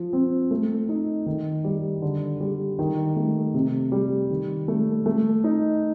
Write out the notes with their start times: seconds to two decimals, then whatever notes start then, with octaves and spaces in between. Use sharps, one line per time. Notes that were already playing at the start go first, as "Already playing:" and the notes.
Already playing: F3
0.13 C4
0.51 A3
0.89 D#4
1.26 D#3
1.64 G3
2.02 D3
2.40 G3
2.79 D#3
3.16 A3
3.54 C3
3.92 G3
4.30 D#3
4.68 A3
5.06 A3
5.44 D#4